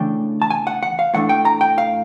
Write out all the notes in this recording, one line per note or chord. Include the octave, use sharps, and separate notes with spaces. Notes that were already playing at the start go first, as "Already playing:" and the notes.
Already playing: C#3 E3 A3 D4 G5
A5
G#5
F#5
F#5
F5
A2 E3 A3 D4 F#5
G5
A#5
G5
F5